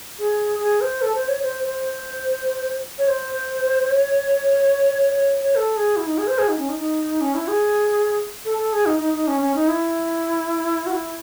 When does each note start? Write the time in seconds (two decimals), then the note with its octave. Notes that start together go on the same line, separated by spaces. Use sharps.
0.19 G#4
0.60 G#4
0.81 C5
1.02 A4
1.15 C5
1.28 C#5
1.42 C5
1.63 C5
2.99 C#5
3.08 C5
3.90 C#5
5.15 C#5
5.42 C#5
5.55 A4
5.76 G#4
5.96 E4
6.07 D#4
6.18 G#4
6.27 C5
6.38 G#4
6.49 D#4
6.59 C#4
6.69 D#4
6.79 D#4
7.21 C#4
7.35 E4
7.48 G#4
8.45 A4
8.58 A4
8.73 G#4
8.86 D#4
8.99 D#4
9.14 D#4
9.27 C#4
9.41 C#4
9.55 D#4
9.68 E4
10.86 F#4
10.92 E4